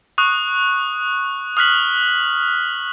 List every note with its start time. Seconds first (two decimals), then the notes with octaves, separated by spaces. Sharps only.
0.18 C#6 D#6 F#6
1.57 D#6 F6 F#6 B6 F#7